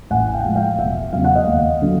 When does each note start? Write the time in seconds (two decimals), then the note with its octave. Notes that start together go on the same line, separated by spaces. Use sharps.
0.10 A1 F#5 G#5
0.34 F5 G5
0.45 A2 F3 G#3
0.56 F5 G5
0.79 E1 E5 F#5
1.13 E2 C#3 F#3 F5
1.24 F#5
1.36 D#5 F5
1.47 D#2
1.82 D3 F#3